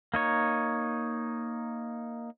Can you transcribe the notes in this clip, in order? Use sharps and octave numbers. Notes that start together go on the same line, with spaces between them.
A#3 D#4 C#5